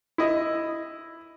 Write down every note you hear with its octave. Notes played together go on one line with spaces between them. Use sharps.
E4 D#5